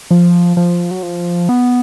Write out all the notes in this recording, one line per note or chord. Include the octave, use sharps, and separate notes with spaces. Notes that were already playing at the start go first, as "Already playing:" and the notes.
F3
F3
F#3
F3
B3